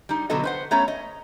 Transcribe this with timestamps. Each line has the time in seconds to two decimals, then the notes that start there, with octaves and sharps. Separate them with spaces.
0.09 G3 D#4
0.30 B2 D3 F#3 B3 A4 D#5
0.44 B4 C5 F#5
0.71 A3 B3 C#4 C#5 A#5
0.88 D#5